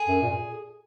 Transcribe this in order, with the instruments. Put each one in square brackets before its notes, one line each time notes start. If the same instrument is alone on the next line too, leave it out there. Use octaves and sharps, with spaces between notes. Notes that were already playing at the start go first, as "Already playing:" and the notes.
Already playing: [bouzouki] G#4
[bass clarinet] F#2
A#2